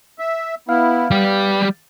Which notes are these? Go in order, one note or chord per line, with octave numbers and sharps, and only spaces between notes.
E5
B3 E4 F5 F6
G3 B3 G4